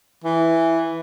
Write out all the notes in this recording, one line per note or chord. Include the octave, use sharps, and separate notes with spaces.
E3